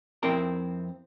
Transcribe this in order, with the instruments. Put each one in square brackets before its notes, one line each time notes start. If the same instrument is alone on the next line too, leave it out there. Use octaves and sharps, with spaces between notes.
[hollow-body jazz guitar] F2 C4 E4 A#4 A#5